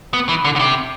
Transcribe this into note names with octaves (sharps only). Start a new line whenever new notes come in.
B3
E3
D3
D3
C3